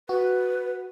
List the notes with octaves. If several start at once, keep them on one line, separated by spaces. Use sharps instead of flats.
F#4 B4